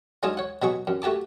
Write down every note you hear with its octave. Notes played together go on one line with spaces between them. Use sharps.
F#3 G#3 D4 D#4 F4 G#4
C#5 F#5
B2 F#3 G#4 C#6
F#2
A3 F#4 G4 A5 D6